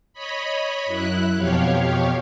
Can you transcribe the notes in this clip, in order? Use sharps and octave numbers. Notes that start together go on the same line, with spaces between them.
C#5 D#5 B5
F#2 E4 F#6
F2 B2 F3 G4 C#5 F5